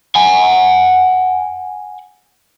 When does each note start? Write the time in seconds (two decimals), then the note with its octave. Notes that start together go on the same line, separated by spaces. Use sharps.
0.16 F#5 G#5